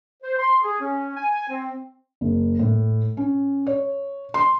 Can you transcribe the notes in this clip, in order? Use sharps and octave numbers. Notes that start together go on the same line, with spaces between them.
C5
C6
G#4
C#4
G#5
C4
F#1
A2
C#4
C#5
C6